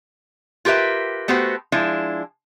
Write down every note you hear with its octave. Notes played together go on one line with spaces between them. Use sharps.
F4 G4 A#4 B4 E5
A3 B3 F#4 G4 C5
F3 G#3 D4 E4